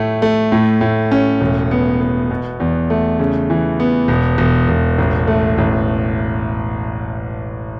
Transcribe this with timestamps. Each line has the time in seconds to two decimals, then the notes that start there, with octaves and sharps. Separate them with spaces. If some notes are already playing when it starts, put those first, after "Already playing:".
Already playing: A2 A3
0.22 A3
0.52 A2
0.81 A2
1.11 C#4
1.41 E1
1.71 B3
2.01 B3
2.31 B2
2.60 E2
2.90 A3
3.19 C#3
3.50 E3
3.80 B3
4.08 E1
4.38 E1
4.69 E1
4.98 A1
5.27 A3
5.58 A1